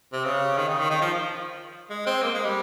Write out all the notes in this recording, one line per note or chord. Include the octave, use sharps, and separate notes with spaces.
C3
C#3
D#3
C#3
D#3
D#3
F3
G#3
C4
A#3
G#3
G3